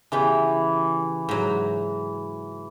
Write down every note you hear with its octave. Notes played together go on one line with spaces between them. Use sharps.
C#3 E3 B3 G4
G#2 F#3